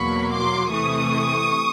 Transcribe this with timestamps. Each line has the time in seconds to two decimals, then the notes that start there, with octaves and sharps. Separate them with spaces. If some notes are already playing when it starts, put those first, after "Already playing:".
Already playing: E2 B2 F#3 A#3 B5 C#6
0.32 C6 D6
0.73 C3 E3 A3 C#6 D#6